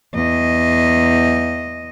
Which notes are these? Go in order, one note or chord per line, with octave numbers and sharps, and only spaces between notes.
E2 D#5